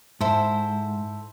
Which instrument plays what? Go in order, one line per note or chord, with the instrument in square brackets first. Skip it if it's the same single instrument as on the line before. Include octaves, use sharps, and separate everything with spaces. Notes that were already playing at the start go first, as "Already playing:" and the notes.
[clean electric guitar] G#2 [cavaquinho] E4 A4 C5